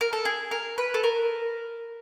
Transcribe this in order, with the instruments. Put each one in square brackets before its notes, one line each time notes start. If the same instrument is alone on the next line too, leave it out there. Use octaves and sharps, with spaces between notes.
[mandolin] A#4
A4
G#4
A#4
B4
A4
A#4